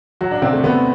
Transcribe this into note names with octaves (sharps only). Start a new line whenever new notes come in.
F#3 F#4
D4
C3 C4
A3
C3 B3